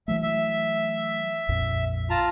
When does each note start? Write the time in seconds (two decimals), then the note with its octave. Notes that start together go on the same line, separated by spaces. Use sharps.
0.08 E3 F#3 A3 E5
0.22 E5
1.49 A#1 F2 A#2
2.10 F4 A5 A#5